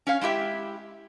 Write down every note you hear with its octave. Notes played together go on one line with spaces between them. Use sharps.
C#4 C#5 F5
G#3 E4 G4 E5 G5